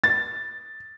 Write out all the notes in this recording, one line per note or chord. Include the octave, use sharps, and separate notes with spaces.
A6